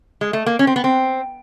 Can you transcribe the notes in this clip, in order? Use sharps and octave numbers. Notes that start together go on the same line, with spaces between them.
G#3
A3
A#3
C#4
C4
B3
C4